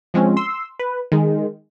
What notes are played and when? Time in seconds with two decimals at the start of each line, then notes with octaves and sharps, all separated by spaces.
0.14 F3 G#3 C4 C#4
0.37 C6 E6
0.79 B4
1.12 D#3 G#3